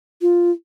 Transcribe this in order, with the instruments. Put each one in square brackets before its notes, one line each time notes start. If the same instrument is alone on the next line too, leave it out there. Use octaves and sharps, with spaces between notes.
[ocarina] F4